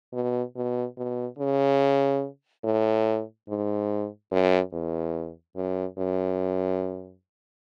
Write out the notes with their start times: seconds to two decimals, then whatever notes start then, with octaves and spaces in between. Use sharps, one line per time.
0.13 B2
0.56 B2
0.97 B2
1.39 C#3
2.64 A2
3.48 G#2
4.32 F#2
4.72 E2
5.56 F#2
5.98 F#2